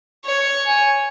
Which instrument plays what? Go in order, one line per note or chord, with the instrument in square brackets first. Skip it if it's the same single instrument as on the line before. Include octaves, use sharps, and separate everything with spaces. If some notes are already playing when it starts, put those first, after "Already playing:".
[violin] C#5
[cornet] G#5